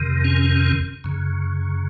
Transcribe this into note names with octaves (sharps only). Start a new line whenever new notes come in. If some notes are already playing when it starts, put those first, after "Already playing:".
Already playing: F2 C3 D#3
C#4
F#2 C#3